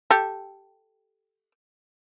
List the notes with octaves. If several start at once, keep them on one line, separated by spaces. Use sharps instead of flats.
G4 A4